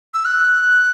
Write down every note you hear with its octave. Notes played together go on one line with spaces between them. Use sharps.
E6
F#6